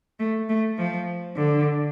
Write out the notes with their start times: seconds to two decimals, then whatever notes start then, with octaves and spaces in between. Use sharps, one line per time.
0.19 A3
0.49 A3
0.78 F3
1.36 D3